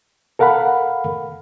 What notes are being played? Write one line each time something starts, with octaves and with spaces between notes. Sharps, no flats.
A4 A#4 F5 F#5 B5